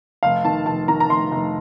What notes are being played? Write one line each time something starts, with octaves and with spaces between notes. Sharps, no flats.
F1 F5
D#3 A5
F1 A5
D#3 A#5
A#5
F1 C6
F1